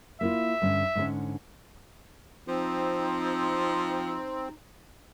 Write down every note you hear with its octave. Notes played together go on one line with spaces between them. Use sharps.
A#3 E4 F4 E5
G2 D3 C#4
G#2 D3 C#4
F3 C4 D#4